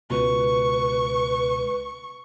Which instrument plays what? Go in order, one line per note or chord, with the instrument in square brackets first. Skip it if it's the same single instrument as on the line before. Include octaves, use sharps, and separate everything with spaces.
[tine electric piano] C#2 B2 [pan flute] B4 [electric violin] C#6